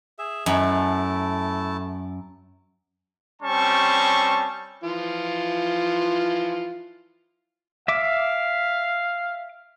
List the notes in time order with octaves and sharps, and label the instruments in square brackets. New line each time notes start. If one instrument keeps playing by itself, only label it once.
[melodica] G#4 E5
[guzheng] F#2 [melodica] A3 E4 A5
[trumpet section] G3 C4 C#4 A5 C#6
[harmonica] E3 F3 F4
[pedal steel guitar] E5 D6 [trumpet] F5